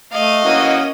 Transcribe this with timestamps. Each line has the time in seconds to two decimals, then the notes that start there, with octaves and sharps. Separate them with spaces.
0.13 A3 D#5 F5 D#7
0.44 E3 A#3 C#4 F#4